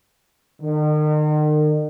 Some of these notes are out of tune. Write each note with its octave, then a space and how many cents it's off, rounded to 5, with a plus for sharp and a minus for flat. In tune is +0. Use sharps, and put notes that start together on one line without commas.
D#3 -40